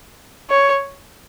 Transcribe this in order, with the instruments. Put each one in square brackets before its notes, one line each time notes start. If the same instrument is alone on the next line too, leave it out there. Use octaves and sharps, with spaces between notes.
[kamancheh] C#5